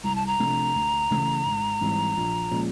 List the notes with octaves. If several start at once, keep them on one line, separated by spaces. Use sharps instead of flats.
C2 A#5
A5
A#5
C3 F3 A3 D4
D2
C#3 E3 A3
G#1
G#2 E3 G3 C4
A#1
A#2 F3 G#3 C#4